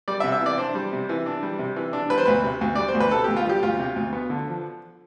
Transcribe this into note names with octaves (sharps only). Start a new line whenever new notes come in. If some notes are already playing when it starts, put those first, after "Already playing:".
G3 D5
E5
C3
E5
E3
D5
D4 C5
G3
C3
E3
D4
G3
C3
E3
D4
G3 B4
C5
D2 B4
C3
D2
G3 D5
C5
D2
B4
C3 A4
D2 G4
F4
G3 G4
D2 F4
C3
D2
B3
D3
F3